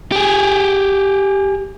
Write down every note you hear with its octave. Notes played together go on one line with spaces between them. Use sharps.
G4 G#4